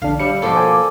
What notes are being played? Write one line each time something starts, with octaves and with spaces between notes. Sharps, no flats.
A#1 D3 D4 F5
G3 D5 E5 C#7
B2 F3 A#3 A4 D5 C6
C5 G#5 D6